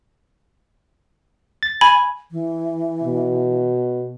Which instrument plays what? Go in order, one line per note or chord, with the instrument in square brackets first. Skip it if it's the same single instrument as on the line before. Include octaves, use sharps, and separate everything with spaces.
[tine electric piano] A6
[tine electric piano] G#5 [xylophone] B5
[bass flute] E3
[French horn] B2